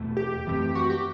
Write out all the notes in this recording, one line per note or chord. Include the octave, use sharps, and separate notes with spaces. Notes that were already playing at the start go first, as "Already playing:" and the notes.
Already playing: E2 B2 A3
G4
F#2 E3 A3 C4
F#4
G4